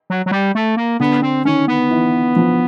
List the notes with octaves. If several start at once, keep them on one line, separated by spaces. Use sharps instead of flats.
F#3
F#3
G3
A3
A#3
D3 B3
C4
D#3 C#4
B3
E3
F3